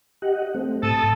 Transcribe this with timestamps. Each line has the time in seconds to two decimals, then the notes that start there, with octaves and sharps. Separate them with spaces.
0.22 G4 D#5 F#5
0.55 A3 C4
0.83 A2 A4 D#6 A6